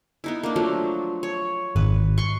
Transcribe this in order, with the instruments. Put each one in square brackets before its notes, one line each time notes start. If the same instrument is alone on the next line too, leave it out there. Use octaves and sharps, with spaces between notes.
[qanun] B3 D#4 E4
A#3 D4
F3 F#3 A3
C#5
[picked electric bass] G#1 [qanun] B4
[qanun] C6 C#6